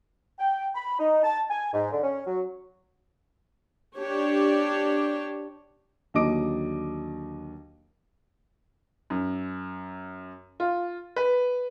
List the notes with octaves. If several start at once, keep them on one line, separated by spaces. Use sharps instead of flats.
G5
B5
D#4
A5
G#5
G#2
D3
C#4
F#3
D4 G4 C#5
D#2 D3 F#3 D#5 D6 D7
F#2
F4
B4